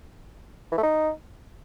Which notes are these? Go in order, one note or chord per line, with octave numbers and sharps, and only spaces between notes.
E3
A3
D#4